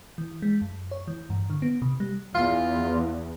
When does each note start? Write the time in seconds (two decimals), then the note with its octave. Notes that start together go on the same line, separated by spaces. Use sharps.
0.18 E3
0.42 G#3
0.61 F#2
0.91 C#5
1.08 E3
1.30 G2
1.50 D3
1.62 B3
1.82 C3
2.00 G3
2.35 E2 F4